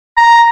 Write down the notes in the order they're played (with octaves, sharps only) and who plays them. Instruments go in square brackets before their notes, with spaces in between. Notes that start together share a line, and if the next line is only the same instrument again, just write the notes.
[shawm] A#5